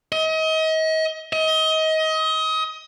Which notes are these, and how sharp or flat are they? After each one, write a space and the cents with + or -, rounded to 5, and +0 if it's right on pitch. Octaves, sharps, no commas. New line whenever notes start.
D#5 +35
D#5 +30